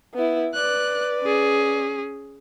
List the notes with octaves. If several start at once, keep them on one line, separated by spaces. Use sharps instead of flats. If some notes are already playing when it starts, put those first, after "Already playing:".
B3 E4
B4 D5 F#6
C#4 G#4